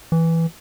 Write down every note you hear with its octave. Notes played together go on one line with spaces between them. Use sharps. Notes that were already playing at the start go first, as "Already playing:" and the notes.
E3